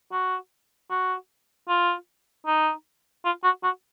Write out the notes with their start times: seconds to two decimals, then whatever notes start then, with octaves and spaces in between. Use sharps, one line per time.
0.12 F#4
0.90 F#4
1.69 F4
2.46 D#4
3.25 F4
3.44 F#4
3.64 F#4